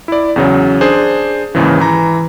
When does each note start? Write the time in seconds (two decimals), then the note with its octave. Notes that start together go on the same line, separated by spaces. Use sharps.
0.08 E4 D5
0.36 E2 C#3 F#3
0.81 D4 G#4 C5
1.55 D#2 G#2 C#3 E3
1.81 E3 A#5